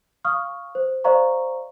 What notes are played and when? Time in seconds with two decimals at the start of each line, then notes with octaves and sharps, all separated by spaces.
0.25 F5 C#6 D#6 F6
0.75 C5
1.04 C5 D5 D#5 F5 A#5 C#6